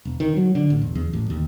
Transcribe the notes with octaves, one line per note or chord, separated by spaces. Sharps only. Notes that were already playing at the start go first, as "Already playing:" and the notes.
E1
D#3
F#3
D3
A1
E1
E2
A1
D#2